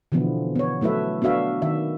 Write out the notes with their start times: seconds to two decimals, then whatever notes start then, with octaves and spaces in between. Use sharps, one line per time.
0.12 B2 D3 E3 F3 B3
0.56 B3 C#5
0.81 F#3 A3 E4 B4 E5
1.22 B3 D4 F#4 E5 F5
1.62 D#3 E5